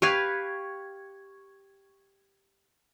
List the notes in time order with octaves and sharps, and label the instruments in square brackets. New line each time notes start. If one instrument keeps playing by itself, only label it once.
[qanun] G4 B4 F5 [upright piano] C#6 G#6